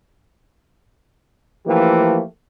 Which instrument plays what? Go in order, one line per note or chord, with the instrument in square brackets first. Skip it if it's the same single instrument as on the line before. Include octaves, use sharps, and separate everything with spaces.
[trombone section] E3 F3 A3 A#3 G4